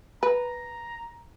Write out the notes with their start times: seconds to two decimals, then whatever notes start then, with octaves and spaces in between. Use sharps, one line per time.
0.23 B4 A#5